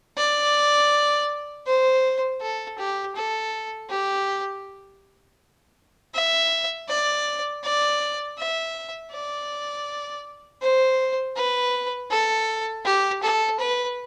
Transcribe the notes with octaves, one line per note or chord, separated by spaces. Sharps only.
D5
C5
A4
G4
A4
G4
E5
D5
D5
E5
D5
C5
B4
A4
G4
A4
B4